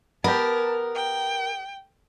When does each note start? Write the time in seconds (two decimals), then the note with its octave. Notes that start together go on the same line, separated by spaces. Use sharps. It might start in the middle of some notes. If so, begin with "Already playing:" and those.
0.24 B3 G4 A#4 A5
0.95 G5